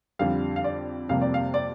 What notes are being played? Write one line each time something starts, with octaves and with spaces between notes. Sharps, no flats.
F2 D3 G3 F5
F5
D5
F2 C3 G3 A#3 F5
D5
F5
D5